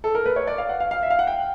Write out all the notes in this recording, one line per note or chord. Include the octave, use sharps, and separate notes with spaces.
A4
A#4
B4
C#5
D5
F5
F#5
F5
F5
E5
F5
F#5
G5